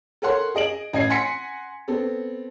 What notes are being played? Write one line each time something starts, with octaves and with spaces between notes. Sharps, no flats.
A4 A#4 C#5 F#5 C6
G#4 D#5 D7 F#7
A1 D#5 G#6 C7
F#5 G#5 C6 A#6 B6 C#7
B3 C4 A4